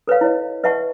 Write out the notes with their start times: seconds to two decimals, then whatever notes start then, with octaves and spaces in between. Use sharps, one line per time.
0.07 A4 B4 C#5 F5
0.21 E4 C#5 D#5
0.64 B4 D#5 E5 F#5 A5 C#6